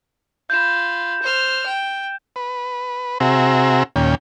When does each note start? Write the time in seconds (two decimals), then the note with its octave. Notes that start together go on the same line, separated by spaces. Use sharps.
0.50 F4 B5 G6 E7
1.22 C5 F6
1.66 G5
2.36 B4
3.20 C3 C4 F#4 G#4 E5 A#5
3.96 D#2 A#2 C#4 G5